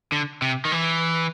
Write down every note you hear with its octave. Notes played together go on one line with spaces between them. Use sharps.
D3
C3
D#3
E3